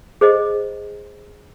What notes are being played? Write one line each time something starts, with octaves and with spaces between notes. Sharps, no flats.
G#4 C5 D#5